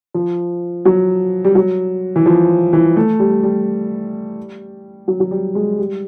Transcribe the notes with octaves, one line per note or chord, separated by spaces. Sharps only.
F3
F#3
G3
F#3
E3
F3
E3
A3
G3
G3
F#3
F#3
G3
G#3
G3